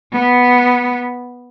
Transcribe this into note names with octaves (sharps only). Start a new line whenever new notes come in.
B3